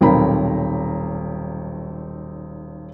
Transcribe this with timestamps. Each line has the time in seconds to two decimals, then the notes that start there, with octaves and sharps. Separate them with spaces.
0.01 D#1 B1 C4 A#4 A#5 B5